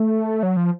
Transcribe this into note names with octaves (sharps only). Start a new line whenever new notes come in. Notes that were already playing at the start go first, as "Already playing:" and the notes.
Already playing: A3
F#3
F3